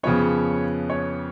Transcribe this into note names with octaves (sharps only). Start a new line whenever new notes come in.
F2 C#3 F3 B3 C#5
C#5